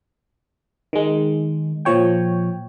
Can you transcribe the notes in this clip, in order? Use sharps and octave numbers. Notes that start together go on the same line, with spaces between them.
D#3 G#3
A#2 F3 C#5 G5